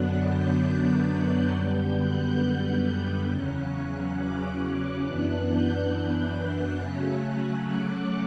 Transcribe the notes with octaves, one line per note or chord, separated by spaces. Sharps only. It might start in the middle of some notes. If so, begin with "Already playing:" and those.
Already playing: F#2 D3 F#3 B3 D4 F#6
G6
F#6
F#2 D3 G3 B3 G6
F#6
F#6
E2 C#3 F#3 C#4
D6
F#2 E3 B3 D4 F#6
G6
F#6
C#3 F#3 A3 C#4
D6